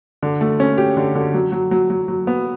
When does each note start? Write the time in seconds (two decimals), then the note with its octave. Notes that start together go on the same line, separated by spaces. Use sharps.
0.23 D3
0.41 A3
0.60 C#4
0.78 G4
0.97 D3
1.15 D3
1.34 F#3
1.52 F#3
1.71 F#3
1.90 F#3
2.08 F#3
2.27 B3